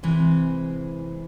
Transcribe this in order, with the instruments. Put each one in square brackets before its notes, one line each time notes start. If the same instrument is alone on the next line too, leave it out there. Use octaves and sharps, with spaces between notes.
[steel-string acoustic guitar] C3 E3 G#3 C5